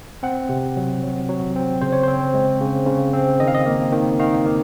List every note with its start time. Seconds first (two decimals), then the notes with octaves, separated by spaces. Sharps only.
0.23 C4 F#5
0.49 C3
0.77 F#3
1.03 F#3
1.29 F#3
1.56 C4
1.82 C#3 C5
1.92 C#5
2.03 C4 C5
2.34 G#3
2.61 C#3
2.87 C#3
3.13 C4
3.40 D#3 D#5
3.48 F5
3.55 D#5
3.66 A#3
3.92 D#3
4.19 D#3 F5
4.46 A#3